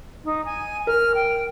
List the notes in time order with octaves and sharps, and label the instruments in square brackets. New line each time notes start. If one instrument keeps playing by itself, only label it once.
[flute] D#4
G#5
[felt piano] A#4 [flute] F6
[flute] G5